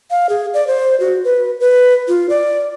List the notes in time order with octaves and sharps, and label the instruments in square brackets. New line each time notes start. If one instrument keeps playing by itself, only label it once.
[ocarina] F5
G#4
D5
C5
F#4
B4
B4
F4
D5